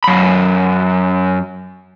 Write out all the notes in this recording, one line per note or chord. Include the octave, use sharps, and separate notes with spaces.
F#2 B5